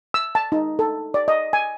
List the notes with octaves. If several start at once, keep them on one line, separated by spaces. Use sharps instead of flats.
E6
A5
D#4
A4
D5
D#5
G#5